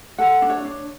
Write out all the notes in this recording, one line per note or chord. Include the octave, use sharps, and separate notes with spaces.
A4 F#5
D4
C#5
D4